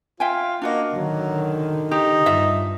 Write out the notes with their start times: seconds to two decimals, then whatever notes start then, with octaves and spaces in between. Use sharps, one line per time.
0.20 F4 E5 G5 G#5
0.62 A#3 D4 F#4 D#5
0.94 D3 D#3 F#3
1.91 D#4 G4
2.26 G2 F4 E5